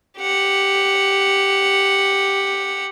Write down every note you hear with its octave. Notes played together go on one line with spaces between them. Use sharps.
G4 F#5